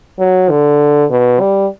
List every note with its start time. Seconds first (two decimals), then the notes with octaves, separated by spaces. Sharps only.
0.19 F#3
0.50 D3
1.10 B2
1.40 G3